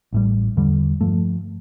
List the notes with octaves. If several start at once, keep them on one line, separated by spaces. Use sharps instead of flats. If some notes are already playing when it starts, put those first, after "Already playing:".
A1 A2 G3
E2 D3 G3
G2 F3 A3